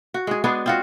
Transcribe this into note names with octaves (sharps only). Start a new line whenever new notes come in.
F#4
G#3 G#4
G#3 B3 D4 G#4
C4 F4 F#4